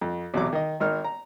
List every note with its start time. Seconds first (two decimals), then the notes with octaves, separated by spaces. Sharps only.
0.01 F2
0.34 B1 E2 C3 F#3 D6
0.53 D#3 D#5
0.80 G#1 D#4 A#4 F6
1.04 A#5